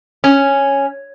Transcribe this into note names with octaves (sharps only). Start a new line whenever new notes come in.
C#4